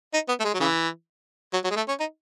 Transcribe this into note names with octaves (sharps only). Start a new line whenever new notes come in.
D#4
B3
A3
G#3
F#3
C#3 E3
F#3
F#3
G#3
A3
C#4
D#4